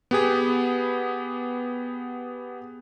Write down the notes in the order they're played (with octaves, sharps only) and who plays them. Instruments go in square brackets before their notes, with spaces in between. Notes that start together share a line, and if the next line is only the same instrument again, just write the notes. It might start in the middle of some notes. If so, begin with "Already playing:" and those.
[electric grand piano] B3 G4 G#4